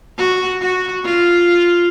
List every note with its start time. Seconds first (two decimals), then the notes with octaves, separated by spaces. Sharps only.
0.18 F#4
0.61 F#4
1.05 F4